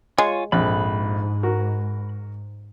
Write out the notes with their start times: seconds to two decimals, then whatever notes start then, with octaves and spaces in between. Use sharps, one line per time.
0.18 G#3 F4 C#5 G#5
0.52 A#1 F2 G#2 B5 F#6
1.43 F#4 A#4